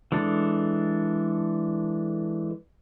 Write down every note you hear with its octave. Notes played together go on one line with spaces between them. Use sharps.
E3 G#3 D4 A4